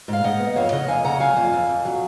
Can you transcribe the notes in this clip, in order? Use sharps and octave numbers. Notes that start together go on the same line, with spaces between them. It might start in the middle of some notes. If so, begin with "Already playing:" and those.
G#2 F5
G#2 D#5 F#5
B3
F2 C#5 F5
C#3 D#5 F#5
F2 F5 G#5
C#3 F#5 A#5
F#3 F5 G#5
F2
F2
F2
F#3